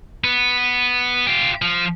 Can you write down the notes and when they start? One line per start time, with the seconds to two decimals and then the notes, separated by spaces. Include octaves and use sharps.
0.24 B3
1.27 F4 G4
1.62 F3